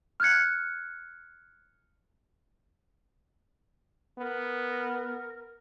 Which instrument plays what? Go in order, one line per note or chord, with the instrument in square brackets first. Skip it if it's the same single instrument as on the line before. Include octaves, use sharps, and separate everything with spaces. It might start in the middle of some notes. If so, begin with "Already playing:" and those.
[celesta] F6 F#6 G#6 C#7
[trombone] B3 [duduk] A#4